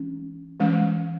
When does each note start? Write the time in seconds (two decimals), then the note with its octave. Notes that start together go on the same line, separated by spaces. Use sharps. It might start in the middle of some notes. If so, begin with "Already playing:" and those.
Already playing: E3 G#3 C#4
0.60 E3 G#3 C#4